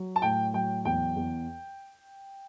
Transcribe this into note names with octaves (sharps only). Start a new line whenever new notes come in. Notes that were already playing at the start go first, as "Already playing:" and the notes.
Already playing: F#3
A5
A2 G5
F#3 G5
E2 G5
E2